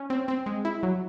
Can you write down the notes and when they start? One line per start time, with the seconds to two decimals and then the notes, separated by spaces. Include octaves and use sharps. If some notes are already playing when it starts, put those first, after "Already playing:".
Already playing: C#4
0.10 C4
0.28 C4
0.46 G#3
0.65 E4
0.83 F#3